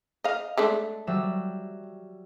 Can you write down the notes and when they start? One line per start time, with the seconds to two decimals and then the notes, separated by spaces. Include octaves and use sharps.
0.24 D#5 F5
0.57 G#3 A3 D4
1.07 F#3 G3 E5